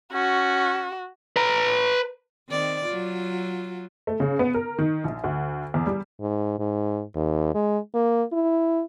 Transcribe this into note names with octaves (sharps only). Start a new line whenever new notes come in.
C#4 F#4
B4 A#5
D#3 C4 D5
F#3 F4
A3
C#3
B3
A#4
D#3
A#1
D2
E2
G3
G#2
G#2
D#2
G#3
A#3
E4